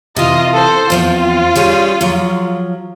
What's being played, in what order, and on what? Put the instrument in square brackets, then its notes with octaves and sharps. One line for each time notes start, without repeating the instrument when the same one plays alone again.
[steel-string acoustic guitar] C3 E3 [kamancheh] F4 D#5
[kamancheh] A4 C5
[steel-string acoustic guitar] E2 F3 C4 [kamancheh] F4
[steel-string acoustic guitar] G3 C#4 G#4
F3 F#3